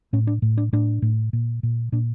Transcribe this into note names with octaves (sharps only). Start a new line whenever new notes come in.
A2 C#4
D4
A2
D4
A2 D4
A2
A#2
A#2
A#2 D4